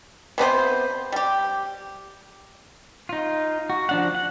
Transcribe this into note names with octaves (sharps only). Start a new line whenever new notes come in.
C3 B3 D4 C5
G3 G4
D#4 F4
F#4
F3 D4 F#5
F#5